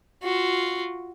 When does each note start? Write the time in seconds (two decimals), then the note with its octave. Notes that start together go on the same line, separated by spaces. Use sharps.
0.23 F4 F#4